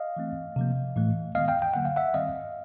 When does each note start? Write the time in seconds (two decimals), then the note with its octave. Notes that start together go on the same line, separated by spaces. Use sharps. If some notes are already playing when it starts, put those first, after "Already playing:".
Already playing: D#5 F5
0.17 E3 A3 C4
0.56 C3 F3 A#3
0.96 A2 E3 A3
1.35 D#3 G#3 B3 D#5 F5
1.48 F5 G5
1.62 G5
1.74 D3 F#3 A#3 F#5
1.85 F5
1.96 E5 F#5
2.14 D#3 G3 C4 D#5 F5